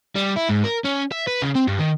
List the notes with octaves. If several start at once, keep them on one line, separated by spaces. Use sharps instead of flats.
G3
E4
G#2
A#4
C#4
E5
B4
C#3
C4
G2
D#3